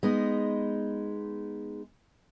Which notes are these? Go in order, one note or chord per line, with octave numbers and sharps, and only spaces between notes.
G#3 B3 D#4